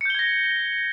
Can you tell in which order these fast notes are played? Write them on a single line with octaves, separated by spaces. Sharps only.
C#7 G6 G7 G#6 A#6